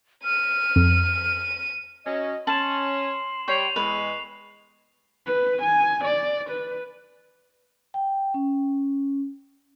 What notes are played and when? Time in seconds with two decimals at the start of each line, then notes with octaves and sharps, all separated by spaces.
0.24 F6 D#7
0.76 F2
2.06 F#3 C#4 D#5
2.47 C#4 A5 C6 E7 F#7
3.48 G3 C#5 G5 C#6 C7 F7
3.76 E2 G#3 B4
5.27 B4
5.62 G#5
6.05 D5
6.50 B4
7.94 G5
8.34 C#4